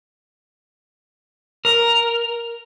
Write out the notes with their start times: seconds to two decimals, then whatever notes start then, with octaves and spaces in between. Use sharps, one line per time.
1.65 A#4